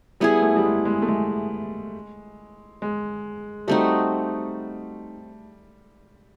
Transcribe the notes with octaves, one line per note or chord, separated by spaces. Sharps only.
G3 B3 E4 G#4
A3
G3
G#3
G#3
A3
G#3
G#3
G3 A3 C4 D#4 F#4